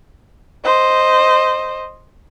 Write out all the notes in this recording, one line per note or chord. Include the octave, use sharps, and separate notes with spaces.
C5 D#5